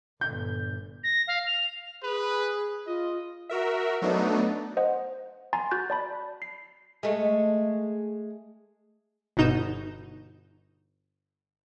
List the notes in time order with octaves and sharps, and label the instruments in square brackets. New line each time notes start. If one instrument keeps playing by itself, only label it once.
[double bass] G1 A#2 [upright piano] G6
[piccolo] A#6
F5
F7
[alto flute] G#4 [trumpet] B4
[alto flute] F4 [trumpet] D#5
[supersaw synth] F#4 A#4 E5
F#3 A3 B3 D4 D#4
[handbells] C5 D#5 F#5
G#5 A#5 C6 A6
F#4 F#6 G6 A6
D5 A5 B5
C7
[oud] G#3 A3
[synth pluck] G1 B2 D#4 G6 E7